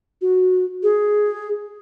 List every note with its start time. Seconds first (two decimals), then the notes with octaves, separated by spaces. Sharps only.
0.21 F#4
0.83 G#4